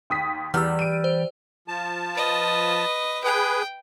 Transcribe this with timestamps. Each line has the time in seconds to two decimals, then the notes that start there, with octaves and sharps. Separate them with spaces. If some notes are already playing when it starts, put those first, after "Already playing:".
0.10 D#2 D#6 B6
0.54 E2 E3 G3 E6 F6
0.79 D7 D#7
1.04 C5
1.68 F3 A5
2.15 B4 D#5
3.24 G#4 B4 G5